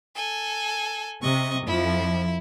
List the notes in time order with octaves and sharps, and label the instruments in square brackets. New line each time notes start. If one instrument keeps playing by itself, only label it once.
[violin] A4 G#5
[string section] C3 [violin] D#5 C#6
[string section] F2 F3 [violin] E4